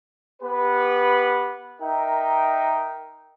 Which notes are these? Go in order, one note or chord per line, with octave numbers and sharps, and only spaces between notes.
B3 G4 B4
D#4 A#4 E5 G5